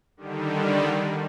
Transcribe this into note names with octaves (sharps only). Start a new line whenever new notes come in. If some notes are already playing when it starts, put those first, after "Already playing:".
D3 D#3 G3